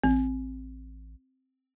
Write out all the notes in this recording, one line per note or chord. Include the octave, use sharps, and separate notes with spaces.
A1 C4